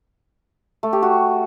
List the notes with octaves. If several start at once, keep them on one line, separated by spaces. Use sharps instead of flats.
A3
G4
F#4